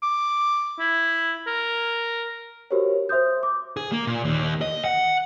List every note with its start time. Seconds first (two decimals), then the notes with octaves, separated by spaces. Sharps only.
0.03 D6
0.79 E4
1.47 A#4
2.71 F#4 G4 A#4 C5 C#5
3.09 C5 E5 C6 D#6 G6
3.43 D6
3.77 G#4
3.92 A#3
4.07 A#2
4.25 D#2
4.61 D#5
4.84 F#5